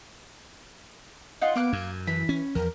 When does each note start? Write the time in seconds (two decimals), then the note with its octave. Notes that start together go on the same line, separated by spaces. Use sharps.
1.41 D#4 F4 F#5
1.56 A#3 B3 D6 F#6
1.73 F#2 G#6
2.07 E3 B5
2.29 C#4
2.55 E2 F3 A#4